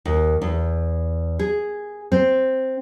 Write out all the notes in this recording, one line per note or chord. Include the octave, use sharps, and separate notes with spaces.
D#2
E2
G#4
C4